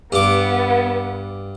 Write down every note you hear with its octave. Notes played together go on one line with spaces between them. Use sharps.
G2 B3 D6